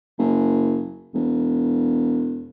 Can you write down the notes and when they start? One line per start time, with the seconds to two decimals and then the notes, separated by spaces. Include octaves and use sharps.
0.19 F#1
1.14 E1